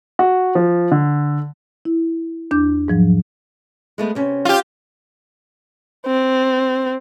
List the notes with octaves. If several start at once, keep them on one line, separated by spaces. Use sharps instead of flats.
F#4
F3
D3
E4
E2 D4 D6 G6
G#2 F3 F#3
G#3 A3 B3
C3 C#4
F4 G4
C4